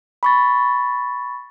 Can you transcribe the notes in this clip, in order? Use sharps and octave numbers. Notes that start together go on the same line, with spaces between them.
B5 C#6 A6